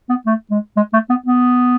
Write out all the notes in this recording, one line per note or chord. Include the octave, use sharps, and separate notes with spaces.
B3
A3
G#3
G#3
A3
B3
B3